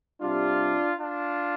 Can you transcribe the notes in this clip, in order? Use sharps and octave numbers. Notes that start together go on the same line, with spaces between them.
C3 G3 D4 F4
D4 F4